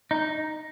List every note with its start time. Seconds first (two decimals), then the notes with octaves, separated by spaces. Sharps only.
0.11 D#4